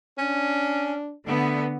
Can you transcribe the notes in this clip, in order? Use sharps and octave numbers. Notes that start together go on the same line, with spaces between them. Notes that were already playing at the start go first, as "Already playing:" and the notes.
C#4 D4
D3 A3 B3